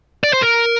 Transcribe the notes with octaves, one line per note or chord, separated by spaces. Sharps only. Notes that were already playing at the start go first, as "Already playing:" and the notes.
D5
C5
A#4